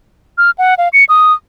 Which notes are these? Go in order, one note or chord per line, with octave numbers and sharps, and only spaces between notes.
F6
F#5
F5
C#7
D#6